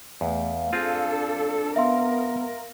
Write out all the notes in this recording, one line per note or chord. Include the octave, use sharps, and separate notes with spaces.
E2 A3 F5
C4 D4 F4 G#4 A4
B3 A#4 E5 F5 C6